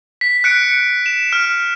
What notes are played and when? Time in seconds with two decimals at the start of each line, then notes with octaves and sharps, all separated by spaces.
0.21 B6
0.44 F#6 C#7 D7
1.06 E7
1.33 F6